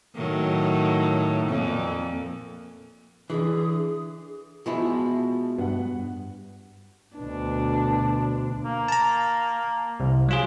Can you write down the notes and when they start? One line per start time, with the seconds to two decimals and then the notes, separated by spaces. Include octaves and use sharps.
0.15 A2 D#3 F#3
1.47 F2 A#2
3.30 D3 E3 G#4
4.66 B2 F3 G#3 E4
5.58 G2 B3 F#5
7.17 D2 B2 D4
8.63 A#3
8.88 A5 A#5
10.00 C2
10.29 F#3 F4 G#4